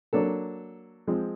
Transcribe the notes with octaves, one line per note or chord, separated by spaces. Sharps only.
F#3 A#3 D4 A4
F3 G#3 C4